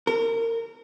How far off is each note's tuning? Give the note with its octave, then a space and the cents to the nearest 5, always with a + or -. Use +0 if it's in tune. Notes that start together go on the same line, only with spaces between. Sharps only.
A#4 -25